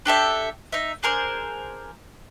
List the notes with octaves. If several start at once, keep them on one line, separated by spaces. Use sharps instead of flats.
D4 G4 A4 E5
D#4 E5
D4 G#4 A#4 C5